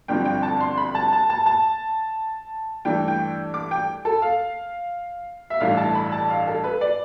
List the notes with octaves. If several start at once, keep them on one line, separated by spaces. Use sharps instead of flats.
G1 G2 D3 F3 C4 G5
G5
A5
C6
B5
A5
A5
A5
A5
G2 E3 A3 D4 G5
G5
D6
G5
A4
F5
E5
A1 G2 E3 A3 F5
A5
B5
A5
F5
A4
B4
D5